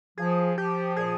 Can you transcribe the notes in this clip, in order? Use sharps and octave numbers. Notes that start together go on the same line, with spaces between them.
F3 G#4
F3 G4
A#2 G#4